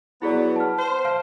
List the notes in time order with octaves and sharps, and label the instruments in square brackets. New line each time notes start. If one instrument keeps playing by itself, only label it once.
[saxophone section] F#3 B3 [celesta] E4 G#4 D5
[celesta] A5 F6
[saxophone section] C5
[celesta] F5 A5 F6